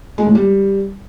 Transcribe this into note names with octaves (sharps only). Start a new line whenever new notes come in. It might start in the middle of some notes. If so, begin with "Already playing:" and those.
G#3
A2
G3